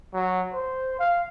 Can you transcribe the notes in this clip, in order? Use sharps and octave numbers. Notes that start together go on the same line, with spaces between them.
F#3
C5
F5